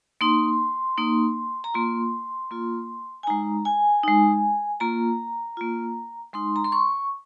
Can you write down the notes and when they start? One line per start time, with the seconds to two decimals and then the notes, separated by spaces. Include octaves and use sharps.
0.21 A#3 D#4 C6
0.97 A#3 D#4
1.64 A#5
1.74 A#3 F4 C6
2.51 A#3 F4
3.23 G#5
3.27 G#3 D#4 A#5
3.65 G#5
4.04 G#3 D#4
4.80 A#3 F4 A#5
5.57 A#3 F4
6.33 G#3 D#4 C6
6.56 A#5
6.64 C6
6.72 C#6